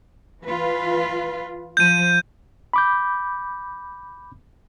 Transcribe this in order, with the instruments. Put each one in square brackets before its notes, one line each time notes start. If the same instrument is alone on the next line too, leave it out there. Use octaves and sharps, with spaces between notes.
[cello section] E3 F4 B4
[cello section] F3 [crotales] G6 D#7
[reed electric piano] B5 D6 G6